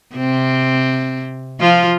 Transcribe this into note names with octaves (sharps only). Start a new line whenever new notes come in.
C3 C4
F3 F4